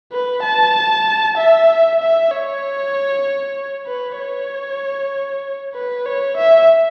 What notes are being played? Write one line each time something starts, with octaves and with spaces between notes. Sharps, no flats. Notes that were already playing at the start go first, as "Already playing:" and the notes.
B4
A5
E5
E5
C#5
B4
C#5
B4
C#5
E5